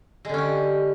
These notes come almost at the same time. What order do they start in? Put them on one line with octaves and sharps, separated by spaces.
G#3 D3 C#4 G4